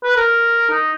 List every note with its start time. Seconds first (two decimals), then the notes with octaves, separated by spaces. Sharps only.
0.04 B4
0.16 A#4
0.70 D#4